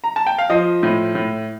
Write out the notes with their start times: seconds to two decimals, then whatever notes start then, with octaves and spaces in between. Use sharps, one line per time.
0.04 A#5
0.16 A5
0.27 G5
0.38 F5
0.50 F3 D#5
0.83 A2
1.15 A2